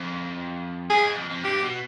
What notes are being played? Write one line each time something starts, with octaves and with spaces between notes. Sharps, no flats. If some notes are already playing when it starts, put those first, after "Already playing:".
Already playing: F2
G2 G#4
G#2
F2
F2
G2 G4
B2